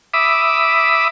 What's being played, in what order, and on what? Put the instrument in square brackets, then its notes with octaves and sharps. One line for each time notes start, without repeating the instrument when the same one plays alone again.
[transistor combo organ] E5 B5 D6 D#6